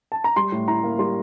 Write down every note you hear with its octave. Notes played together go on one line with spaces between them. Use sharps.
A5
A#5
G3 C6
A2
E4 A#5
A#3
G3 C6